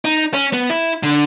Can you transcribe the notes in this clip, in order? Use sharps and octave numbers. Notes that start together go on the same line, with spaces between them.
D#4
C#4
B3
E4
D3